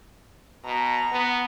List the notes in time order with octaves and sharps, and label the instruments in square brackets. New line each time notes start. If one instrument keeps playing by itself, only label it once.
[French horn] B2 [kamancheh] A#5
[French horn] B3